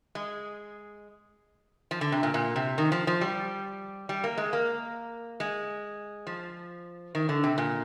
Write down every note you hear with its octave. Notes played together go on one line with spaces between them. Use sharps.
G#3
F3
D3
C3
A#2
A#2
C3
D#3
F3
F3
G3
G3
A#3
G#3
A#3
G#3
F3
D#3
D3
C3
A#2